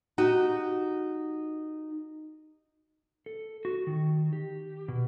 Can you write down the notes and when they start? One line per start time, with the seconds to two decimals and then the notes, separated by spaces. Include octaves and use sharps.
0.18 D#4 F#4 G4
3.26 A4
3.65 F#4
3.87 D#3
4.33 G4
4.88 B2